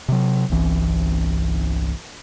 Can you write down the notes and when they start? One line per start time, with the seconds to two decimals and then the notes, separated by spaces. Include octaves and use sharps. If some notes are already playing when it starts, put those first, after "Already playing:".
0.08 C3 F#3
0.50 G1 C2 E3